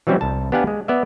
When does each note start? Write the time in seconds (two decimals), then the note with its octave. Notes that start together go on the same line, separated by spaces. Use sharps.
0.07 E3 F#3 G3 C4 C#4 E4
0.21 C2 A5
0.52 B3 D4 G4 F5 F#5 G#5
0.67 G#3
0.88 B3 D5 E5